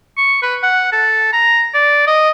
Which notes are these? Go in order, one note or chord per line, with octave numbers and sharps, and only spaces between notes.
C#6
B4
F#5
A4
A#5
D5
D#5